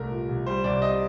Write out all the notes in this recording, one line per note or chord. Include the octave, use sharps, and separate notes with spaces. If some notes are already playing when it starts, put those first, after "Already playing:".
Already playing: C2 A3 A#4
A#2
C2
G3 C5
C2 D5
C3 D#5